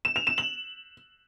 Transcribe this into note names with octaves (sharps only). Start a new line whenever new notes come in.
E7
F7
E7
F#7